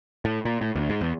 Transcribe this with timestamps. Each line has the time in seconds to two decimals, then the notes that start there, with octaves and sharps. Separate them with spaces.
0.25 A2
0.45 A#2
0.61 A2
0.76 D2
0.90 G#2
1.01 E2